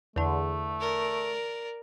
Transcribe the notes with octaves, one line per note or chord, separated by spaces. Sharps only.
E2 D3 A3
A#4 D5